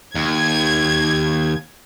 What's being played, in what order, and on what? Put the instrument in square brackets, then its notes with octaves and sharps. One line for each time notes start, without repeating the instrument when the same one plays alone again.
[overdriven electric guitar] D#2 [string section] G#6